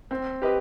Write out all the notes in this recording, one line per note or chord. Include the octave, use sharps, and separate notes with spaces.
C4
G4 B4 D#5